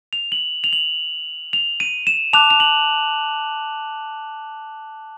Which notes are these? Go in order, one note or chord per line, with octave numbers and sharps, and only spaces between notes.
F7
F#7
F7
F#7
F7
D#7
E7
A5 D6 F#6 F7
F7
F#7